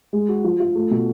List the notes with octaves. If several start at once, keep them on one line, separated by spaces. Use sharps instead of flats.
G#3
F#4
F3
F4
A3
B2